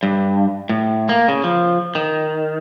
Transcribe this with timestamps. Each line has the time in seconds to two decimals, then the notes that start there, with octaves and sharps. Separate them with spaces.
0.03 G2
0.69 A2
1.09 A#3
1.28 C#3
1.44 F3
1.95 D#3